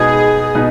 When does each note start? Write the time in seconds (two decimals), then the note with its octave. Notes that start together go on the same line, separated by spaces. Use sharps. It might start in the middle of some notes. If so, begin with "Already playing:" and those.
Already playing: B2 G#3 B3 D#4 G#4
0.55 B2 B3 D#4